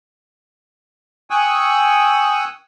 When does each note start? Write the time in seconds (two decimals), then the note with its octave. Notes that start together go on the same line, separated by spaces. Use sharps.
1.30 G5 G#5 C#6 D#6 E6 F#6